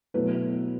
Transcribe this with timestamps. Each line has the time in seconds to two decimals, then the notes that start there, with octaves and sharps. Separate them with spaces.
0.14 B2 F#3 A3 E4 B4